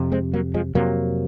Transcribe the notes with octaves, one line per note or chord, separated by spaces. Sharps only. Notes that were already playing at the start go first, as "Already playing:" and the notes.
Already playing: F2 C3
G#3 C4
F#3 A#3
F3 G#3
F2 C3 F#3 A#3